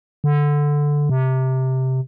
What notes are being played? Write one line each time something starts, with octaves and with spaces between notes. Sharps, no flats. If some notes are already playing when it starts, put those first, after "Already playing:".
D3
C3